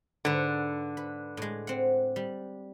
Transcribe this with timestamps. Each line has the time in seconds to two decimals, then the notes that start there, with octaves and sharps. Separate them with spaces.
0.25 G#2 D3 B4
0.97 B4
1.37 A2 G#3
1.67 C4 F#5
2.16 G3